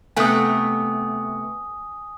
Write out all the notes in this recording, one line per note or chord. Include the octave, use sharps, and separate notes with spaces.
C3 A3 B3 G#5 D#6